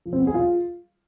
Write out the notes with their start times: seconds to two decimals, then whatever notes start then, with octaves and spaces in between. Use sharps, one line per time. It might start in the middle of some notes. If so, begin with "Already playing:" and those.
0.05 F3
0.13 C4
0.20 B3
0.27 G#4
0.34 F4